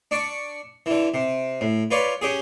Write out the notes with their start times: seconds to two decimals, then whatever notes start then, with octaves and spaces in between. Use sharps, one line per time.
0.11 D4 D5 C#6
0.86 D3 E3
1.14 C3
1.61 A2
1.91 F4 B4 C#5 D5
2.22 C#4 G4 G#4